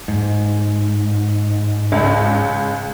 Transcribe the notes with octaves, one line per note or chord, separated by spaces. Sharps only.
G#2
C#2